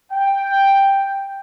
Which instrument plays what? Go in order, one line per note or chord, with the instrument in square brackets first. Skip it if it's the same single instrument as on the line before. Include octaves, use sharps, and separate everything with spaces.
[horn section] G5